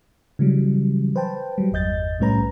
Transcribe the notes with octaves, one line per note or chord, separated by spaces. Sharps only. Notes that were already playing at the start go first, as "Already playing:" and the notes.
C#3 E3 F#3 G3
B4 C5 G5 A5
F#3 G3
G1 E2 D#5 G6 A6
C2 A2 G3 C#4 B4 A#5